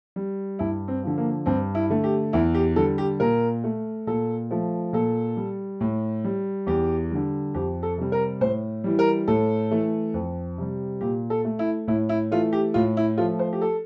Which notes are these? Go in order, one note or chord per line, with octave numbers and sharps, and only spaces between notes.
G3
G2 E4
C4
D3 F3
A#3
G2 C4
E4
D3 A3
G4
E2 E4
G4
D3 G3 A4
G4
A#2 A#4
A3
A#2 A4
F3 A3
A#2 A4
G3
A2
G3
E2 G4
D3 G3
F2 G4
A4
C3 G3
A#4
A2 C5
E3 G3
A#4
A2 A4
E3 A3
F2
C3 G3
A#2 G4
A4
A3
E4
A2 E4
E4
E3 A3 F4
G4
A2 F4
E4
F3 A3 F4
C5
G4
A4